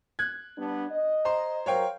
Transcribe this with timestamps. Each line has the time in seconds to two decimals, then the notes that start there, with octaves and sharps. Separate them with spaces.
0.19 F#6 G#6
0.57 G3 B3 D4
0.91 D#5
1.25 C5 A#5 C6
1.66 F#3 A#4 C5 C#5 F5 G5